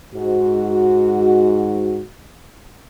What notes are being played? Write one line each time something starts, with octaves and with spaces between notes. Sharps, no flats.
G#2 F#4